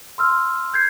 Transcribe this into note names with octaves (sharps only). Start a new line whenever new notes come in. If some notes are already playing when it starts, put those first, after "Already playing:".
C6 E6 F6
G6 G#6 C7